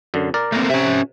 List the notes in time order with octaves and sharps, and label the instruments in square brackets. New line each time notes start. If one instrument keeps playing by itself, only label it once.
[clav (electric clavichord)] F#2 D3
A#4 D5
[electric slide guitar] A3 A#3 C4
[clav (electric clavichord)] C3 [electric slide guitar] C#4 E5